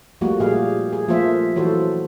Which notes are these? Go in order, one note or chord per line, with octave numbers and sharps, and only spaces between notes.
F3 G3 A3 A#3 F#4
A#2 F3 G#3 G4 G#4 F5
G#4
F3 A3 A#3 F4 C5 E5
E3 F#3 F#4 A4 C5